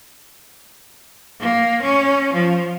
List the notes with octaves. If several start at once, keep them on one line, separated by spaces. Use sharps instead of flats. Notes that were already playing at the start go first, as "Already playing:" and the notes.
A#3
C#4
F3